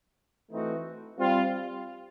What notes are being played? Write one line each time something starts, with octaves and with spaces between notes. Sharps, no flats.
E3 A3 C4 D#4 F#4
G3 C4 F4